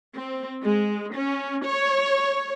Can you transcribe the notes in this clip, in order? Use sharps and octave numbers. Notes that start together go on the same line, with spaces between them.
C4
G#3
C#4
C#5